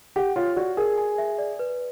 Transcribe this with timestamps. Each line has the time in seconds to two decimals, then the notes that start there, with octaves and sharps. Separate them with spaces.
0.16 G4 F#5
0.36 F4 C#5
0.56 F#4 D5
0.77 G#4 A#4
0.98 G#5
1.18 E5
1.38 D5
1.59 B4